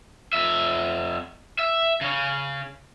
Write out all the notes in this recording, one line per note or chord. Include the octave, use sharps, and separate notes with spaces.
F2 E5
E5
C#3 C#4